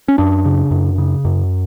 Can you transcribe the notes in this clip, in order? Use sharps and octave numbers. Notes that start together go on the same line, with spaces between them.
C#4
F#2 D4
C#3
F#2
C#3
F#2